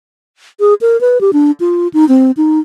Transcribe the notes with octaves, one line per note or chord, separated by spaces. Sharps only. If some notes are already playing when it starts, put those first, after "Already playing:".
G#4
A#4
B4
G4
D4
F4
D#4
C4
D#4